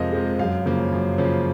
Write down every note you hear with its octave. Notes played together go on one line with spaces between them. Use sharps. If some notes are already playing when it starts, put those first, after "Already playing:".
Already playing: F2 C3 F3 G#3 A#4 C5 D#5 F5
C3 F3 G#3
F#2 F5
C#3 F3 A#3
F#2
C#3 F3 A#3